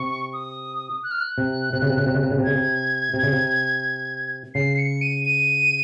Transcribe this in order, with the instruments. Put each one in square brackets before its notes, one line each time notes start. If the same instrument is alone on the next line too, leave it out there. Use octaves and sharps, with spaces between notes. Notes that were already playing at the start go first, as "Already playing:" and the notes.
Already playing: [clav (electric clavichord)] C3 [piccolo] C#6
[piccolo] D#6
F#6
F6
F#6
[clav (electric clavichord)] C3
C3
C#3
C3
C#3
C3
C#3
C3
C#3
C3
[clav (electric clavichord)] C#3 [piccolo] G#6
[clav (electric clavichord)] C3
C3
C#3
C3
[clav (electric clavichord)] C#3 [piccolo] C7
[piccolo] C7
C#7
D#7
D#7